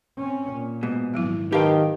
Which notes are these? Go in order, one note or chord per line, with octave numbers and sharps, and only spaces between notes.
C4 C#4
A#2
G#2 B2
G#1 F3 F#3 E4
D#3 G4 B4 F5 G5 A5 B5